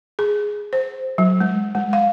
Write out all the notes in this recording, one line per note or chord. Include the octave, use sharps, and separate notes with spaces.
G#4
C5
F#3
G#3
G#3
F5